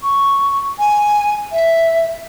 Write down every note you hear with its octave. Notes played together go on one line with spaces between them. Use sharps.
C#6
G#5
E5